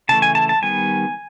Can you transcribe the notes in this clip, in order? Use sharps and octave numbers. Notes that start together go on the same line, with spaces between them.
C#3 E3 A3 A5
G#5
A5
A5
D#3 G3 B3 G#5